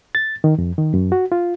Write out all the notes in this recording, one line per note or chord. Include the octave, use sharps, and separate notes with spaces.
A6
D#3
F2
D#3
F#2
F#4
F4